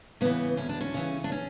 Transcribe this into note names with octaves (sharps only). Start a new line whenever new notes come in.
C#3 E3 B3
D2 C#4
D4
C#4
C#3 E3
D4
C#4